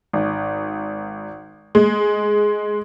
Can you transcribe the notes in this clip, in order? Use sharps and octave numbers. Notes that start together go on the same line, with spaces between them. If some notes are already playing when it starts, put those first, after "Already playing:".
G#1
G#3